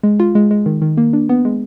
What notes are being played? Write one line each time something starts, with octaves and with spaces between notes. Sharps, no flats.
G#3
F4
G#3
G#3
D#3
D#3
A#3
D4
B3
G#3